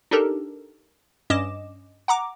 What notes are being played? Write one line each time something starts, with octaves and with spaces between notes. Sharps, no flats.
D4 D#4 G4 A4 A#4
G2 C#4 D#5 D6 E7
F#5 A#5 D6